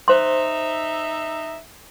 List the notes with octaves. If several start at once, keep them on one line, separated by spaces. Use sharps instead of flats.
D#4 C5 D#5 E5 C6